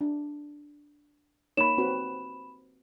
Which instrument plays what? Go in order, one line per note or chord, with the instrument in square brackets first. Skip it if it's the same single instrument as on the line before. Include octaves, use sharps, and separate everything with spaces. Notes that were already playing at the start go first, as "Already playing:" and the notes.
[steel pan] D4
[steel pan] A#3 D#4 C#5 [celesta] B5 E7
[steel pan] C4 F#4 B4